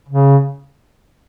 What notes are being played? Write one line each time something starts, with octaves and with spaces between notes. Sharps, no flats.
C#3